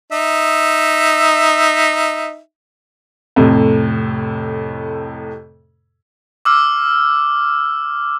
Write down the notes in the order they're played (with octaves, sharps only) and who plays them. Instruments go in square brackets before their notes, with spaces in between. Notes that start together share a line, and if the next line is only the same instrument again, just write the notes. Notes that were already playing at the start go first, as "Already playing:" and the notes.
[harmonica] D#4 E5
[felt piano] F2 A2 C3
[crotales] D6 E6 F6